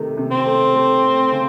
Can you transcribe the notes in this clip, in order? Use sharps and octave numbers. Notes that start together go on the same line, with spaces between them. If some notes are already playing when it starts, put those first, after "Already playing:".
Already playing: C3 D#3 A3
C3
C4
A3
A3
A3
C#3